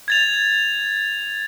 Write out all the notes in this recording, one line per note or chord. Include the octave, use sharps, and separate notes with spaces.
G#6 A6 F7